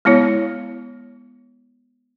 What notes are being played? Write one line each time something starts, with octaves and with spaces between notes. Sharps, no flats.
G#3 B3 E4 C#5